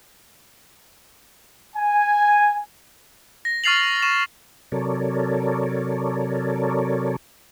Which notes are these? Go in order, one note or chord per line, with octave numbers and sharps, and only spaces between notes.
G#5
A#6
C#6 F6 A6 C7 F7 F#7
C#6 E7
C3 F#3 A4 A#4 C#5 D5